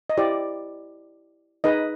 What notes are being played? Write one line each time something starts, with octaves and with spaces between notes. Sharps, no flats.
D#5
E4 G4 C5 D5
D#4 G#4 B4 D#5